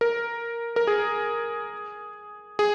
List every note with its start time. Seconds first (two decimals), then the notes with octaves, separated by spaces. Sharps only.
0.01 A#4
0.76 A#4
0.87 G#4
2.59 G#4